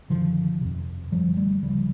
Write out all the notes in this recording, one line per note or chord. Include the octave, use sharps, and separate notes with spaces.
F#2 D3 D#3 F3
F2 C3
F#2 D3 F3 G3
G3 A3
D2 C#3 F3 G3